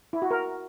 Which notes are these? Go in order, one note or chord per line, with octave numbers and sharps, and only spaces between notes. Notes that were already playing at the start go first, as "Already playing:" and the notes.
E4
F#4
A#4